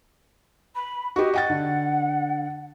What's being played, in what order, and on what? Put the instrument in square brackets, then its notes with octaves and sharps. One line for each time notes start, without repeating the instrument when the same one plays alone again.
[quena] B5
[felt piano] F#4 G4 [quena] D#5
[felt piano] D#5 G5 A6 [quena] F#5
[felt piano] D3